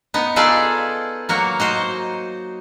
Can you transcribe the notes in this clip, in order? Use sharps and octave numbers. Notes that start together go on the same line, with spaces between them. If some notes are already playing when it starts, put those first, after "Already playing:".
B3 D#4
D#4 F4 G#4 A4 B4 D5
F#3 A#3 F#4
D#4 F#4 C5